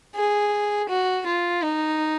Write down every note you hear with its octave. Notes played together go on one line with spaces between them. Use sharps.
G#4
F#4
F4
D#4